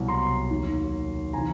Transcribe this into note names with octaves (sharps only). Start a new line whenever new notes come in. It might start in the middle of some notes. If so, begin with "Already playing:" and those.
Already playing: C2 B2 F#3
A#5 C6
D#2 D#3 F#3
C3 E3 G#5 A#5